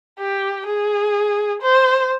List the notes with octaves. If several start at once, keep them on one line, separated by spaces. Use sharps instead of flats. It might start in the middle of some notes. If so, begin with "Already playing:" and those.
G4
G#4
C5